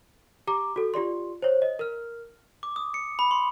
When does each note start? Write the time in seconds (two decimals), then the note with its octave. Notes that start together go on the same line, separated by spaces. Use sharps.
0.47 G4 A#5 D6
0.76 F#4 A4
0.94 F4 G4 D5 C6
1.42 C5 C#5
1.62 D#5
1.79 A#4 F6
2.63 D6
2.76 D#6
2.94 C#7
3.19 B5
3.31 C6